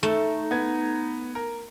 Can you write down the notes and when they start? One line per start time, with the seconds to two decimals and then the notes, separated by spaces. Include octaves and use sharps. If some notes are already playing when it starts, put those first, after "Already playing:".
0.03 A3 D#4 A4
0.51 B3 G#6
1.35 A#4